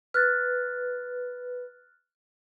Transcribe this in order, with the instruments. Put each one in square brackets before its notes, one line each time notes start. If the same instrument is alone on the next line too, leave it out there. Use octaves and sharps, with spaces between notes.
[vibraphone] B4 [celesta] F6 F#6 A6